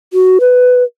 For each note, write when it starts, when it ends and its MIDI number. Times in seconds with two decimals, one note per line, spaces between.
0.13 0.38 66
0.40 0.83 71